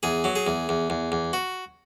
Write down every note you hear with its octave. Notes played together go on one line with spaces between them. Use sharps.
E2 G#4
F#3
G#4
E2
E2
E2
E2
F#4